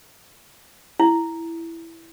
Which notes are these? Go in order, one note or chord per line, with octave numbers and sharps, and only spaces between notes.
E4